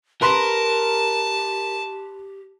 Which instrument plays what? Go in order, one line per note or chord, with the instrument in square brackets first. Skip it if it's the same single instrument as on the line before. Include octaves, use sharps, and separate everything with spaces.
[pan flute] G4 [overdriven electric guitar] A#4 [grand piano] B4 C6 [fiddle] A5